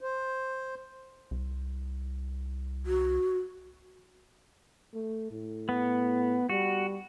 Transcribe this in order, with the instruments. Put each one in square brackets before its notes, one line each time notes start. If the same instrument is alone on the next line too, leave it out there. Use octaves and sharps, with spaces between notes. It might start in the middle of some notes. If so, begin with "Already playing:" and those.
[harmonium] C5
[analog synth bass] C2
[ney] F#4
[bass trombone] A3
A2
[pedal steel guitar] B3
[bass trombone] G3 [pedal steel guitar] F#4